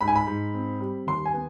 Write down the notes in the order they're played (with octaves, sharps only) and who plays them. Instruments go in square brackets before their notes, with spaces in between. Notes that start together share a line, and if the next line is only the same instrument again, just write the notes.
[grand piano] G#2 B5
G#5
B5
G#2
C4
G3
D#2 C6
G#5
B3